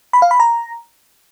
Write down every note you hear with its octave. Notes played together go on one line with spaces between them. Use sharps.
B5
F5
B5
A#5